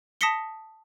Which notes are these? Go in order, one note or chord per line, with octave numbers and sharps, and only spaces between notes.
A5 D#6 A#6 B6 C#7 G7